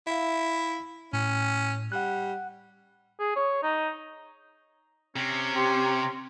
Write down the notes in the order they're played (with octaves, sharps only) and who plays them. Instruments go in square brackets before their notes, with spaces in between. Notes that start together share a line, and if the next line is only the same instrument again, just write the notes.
[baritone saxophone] E4 [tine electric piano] E5 F5
[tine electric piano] A2 [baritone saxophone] C#4
[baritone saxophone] G3 [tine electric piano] F#5 F#6
[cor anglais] G#4
C#5
D#4
[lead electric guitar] C3 [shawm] C#4
[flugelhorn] G4 [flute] C6